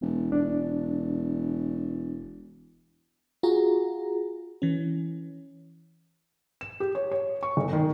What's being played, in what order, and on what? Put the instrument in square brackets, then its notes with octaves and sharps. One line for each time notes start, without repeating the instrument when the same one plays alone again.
[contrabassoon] E1
[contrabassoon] E1 [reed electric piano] D4
[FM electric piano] F4 F#4 G#4 A#5
E3 C#4
[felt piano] E7
G4
C#5
C#5
C#6
G1
D#3